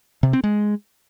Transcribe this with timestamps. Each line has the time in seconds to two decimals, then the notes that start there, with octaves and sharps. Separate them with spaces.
0.23 C3
0.33 C4
0.44 G#3